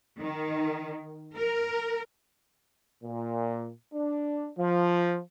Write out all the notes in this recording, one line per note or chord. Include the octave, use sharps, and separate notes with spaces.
D#3
A#4
A#2
D4
F3